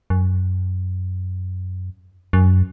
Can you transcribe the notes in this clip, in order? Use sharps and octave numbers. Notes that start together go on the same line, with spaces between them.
F#2
F#2